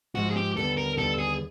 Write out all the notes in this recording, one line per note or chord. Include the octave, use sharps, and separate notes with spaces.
G#2 F3 G#3 F#4
G#4
G4
D#2 D3 G3 B3 A4
A#4
D#2 D3 G3 B3 A4
G#4